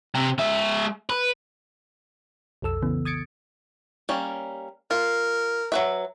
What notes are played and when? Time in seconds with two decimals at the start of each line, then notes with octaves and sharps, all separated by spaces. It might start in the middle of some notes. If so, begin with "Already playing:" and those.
0.15 C3
0.39 G#3 E5
1.09 B4
2.62 B1 F2 A4 E6
2.82 C#3 E3 B3
3.05 D#6 G#6 A6 C#7 D7
4.09 G3 A#3 C#4
4.91 F4 A#4
5.72 F#3 B4 E5